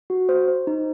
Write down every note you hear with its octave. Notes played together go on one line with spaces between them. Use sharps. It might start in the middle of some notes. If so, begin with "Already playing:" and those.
F#4
C5
C5
D#4